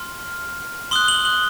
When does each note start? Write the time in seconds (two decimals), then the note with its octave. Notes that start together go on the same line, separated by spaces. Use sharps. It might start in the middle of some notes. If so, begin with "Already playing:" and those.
Already playing: C6 F6
0.91 C6 D#6 F#6 G7
1.08 F#7
1.25 F#7